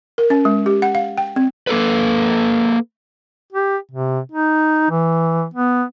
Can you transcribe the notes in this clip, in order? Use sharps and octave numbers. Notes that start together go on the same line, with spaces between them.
A#4
C#4
G#3
G4
F#5
F5
G5
C4
A#3 A4 B4
G4
C3
D#4
E3
B3